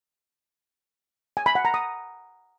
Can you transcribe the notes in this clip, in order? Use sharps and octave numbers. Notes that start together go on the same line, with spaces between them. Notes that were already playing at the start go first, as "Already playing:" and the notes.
G#5
B5
F#5
A#5
D#6